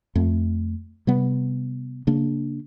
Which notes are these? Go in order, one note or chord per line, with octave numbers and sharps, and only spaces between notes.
F2 A3
C3 G3 B3
C#3 A#3 D4